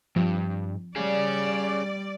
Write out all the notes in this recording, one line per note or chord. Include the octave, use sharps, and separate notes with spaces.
G2 F3
G3 C#4 G#4 D5